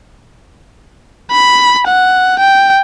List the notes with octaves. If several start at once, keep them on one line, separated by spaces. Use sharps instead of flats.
B5
F#5
G5